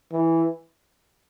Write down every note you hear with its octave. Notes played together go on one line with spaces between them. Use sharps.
E3